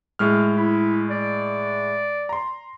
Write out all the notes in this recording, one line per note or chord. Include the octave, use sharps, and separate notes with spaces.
A2 G#3 F6
E4
D5
A#5 C6